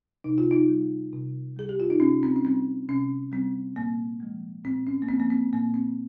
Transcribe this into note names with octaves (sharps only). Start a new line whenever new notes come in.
C3 D#4
F4
D#4
G3
C3
G3 G#4
G4
F4
D#4
C3 C#4
C4
C#4
G3 C4
C3 C#4
G3 C4
A#2 A#3
F3 G#3
A#2 C4
C#4
A#3
F3 G#3 C4
A#3
C4
A#2 A#3
C4